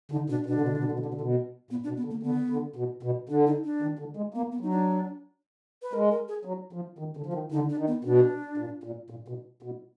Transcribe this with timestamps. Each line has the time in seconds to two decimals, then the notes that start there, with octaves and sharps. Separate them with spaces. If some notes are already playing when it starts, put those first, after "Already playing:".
0.12 D3 D#4
0.29 B2 D4
0.46 B2 D4
0.55 D3
0.61 B2
0.68 D3
0.77 B2
0.84 D3
0.92 B2
0.99 D3
1.06 B2
1.14 D3
1.21 B2
1.70 A#2 B3
1.83 D4
1.88 B2
1.96 B3
2.05 D3
2.10 A#3
2.23 D3 B3
2.50 D3
2.76 B2
3.03 B2
3.29 D3 D4
3.46 D#4
3.64 D4
3.82 D#3
3.99 D3
4.17 G#3
4.34 A#3 B3
4.52 B3
4.61 F#3 D#4
4.70 D4
5.82 B4
5.93 G#3 A#4
6.11 A#4
6.28 G#4
6.45 F#3
6.73 F3
6.99 D#3
7.17 D3
7.26 F3
7.33 D#3
7.51 D3 D#4
7.69 D4
7.78 D#3
7.87 B3
8.04 B2 D4
8.57 A#2
8.84 A#2
9.10 A#2
9.28 B2
9.62 B2